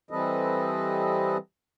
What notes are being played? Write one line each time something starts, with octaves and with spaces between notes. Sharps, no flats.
E3 G3 C4 A4 B4 D#5